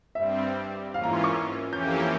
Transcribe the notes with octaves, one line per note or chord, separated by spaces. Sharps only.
G2 G3 C4 E5
G#2 E3 A#3 C#4 F4 F5
A#5
C6
C#6
E6
F2 E3 A#3 C#4 G4 G6